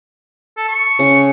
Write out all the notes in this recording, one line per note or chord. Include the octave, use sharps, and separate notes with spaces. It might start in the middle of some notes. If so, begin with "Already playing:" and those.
A4
C#6
C#3